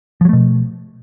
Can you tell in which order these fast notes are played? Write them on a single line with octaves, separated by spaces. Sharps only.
F3 F#3 A3 B2